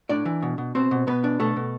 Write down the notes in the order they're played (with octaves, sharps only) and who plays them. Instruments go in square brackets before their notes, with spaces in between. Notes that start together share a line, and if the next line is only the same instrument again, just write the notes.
[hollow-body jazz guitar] A2 D4 D5
E3
B2
B2
B2 C4 C5
B2
B2 B3 B4
D4
B2 A3 A4
B2